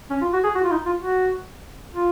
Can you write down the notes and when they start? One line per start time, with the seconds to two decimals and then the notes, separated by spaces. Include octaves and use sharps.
0.10 C#4
0.21 F4
0.33 F#4
0.44 G#4
0.55 F#4
0.64 F4
0.71 D#4
0.86 F4
1.01 F#4
1.93 F4